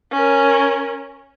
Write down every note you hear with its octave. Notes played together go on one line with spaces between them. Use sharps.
C#4 A#4